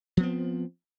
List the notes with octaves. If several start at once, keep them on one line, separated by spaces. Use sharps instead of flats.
F3 B3 C4